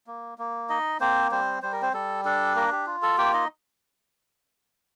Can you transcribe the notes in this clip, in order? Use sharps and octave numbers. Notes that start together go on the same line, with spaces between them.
A#3
A#3
D#4 D#5
A#3 C4 C5
G3 C4 C5
G3 C5
A#4
C4 C5
G3 A4
D4 A4
A#3 A#4
G4
F4
A4
A#3 G4 G5
D#4 D#5